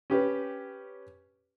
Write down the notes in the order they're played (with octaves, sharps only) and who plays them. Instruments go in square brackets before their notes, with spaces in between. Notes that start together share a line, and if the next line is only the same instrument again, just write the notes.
[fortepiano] C#4 G4 B4